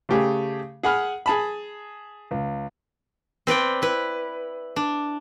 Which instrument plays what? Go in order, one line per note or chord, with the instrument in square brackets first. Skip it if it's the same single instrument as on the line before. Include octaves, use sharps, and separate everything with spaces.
[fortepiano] C#3 A3 G4 G#4
G#4 F#5 B5 F6
G#4 A5 B5
C#2
[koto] C4 B4 D5 G5
E4 B4
D4